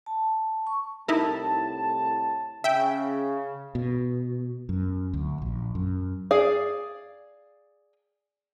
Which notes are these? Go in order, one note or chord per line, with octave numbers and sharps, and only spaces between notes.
A5
C#6
C2 A2 D#4 E4 A#4 A5
C#3 E5 G5
B2
F#2
D2
A#1
F#2
G#4 D5 F5